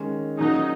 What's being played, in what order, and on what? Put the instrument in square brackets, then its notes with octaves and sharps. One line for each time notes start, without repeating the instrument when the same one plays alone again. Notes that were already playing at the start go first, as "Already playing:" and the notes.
Already playing: [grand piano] D#3 G#3 C#4
[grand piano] A#2 F#3 C#4 G#4 [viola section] D#4